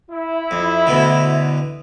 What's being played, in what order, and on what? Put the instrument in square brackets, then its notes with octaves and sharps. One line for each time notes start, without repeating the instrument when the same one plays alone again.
[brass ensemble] E4
[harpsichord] F2
D2 B2 D3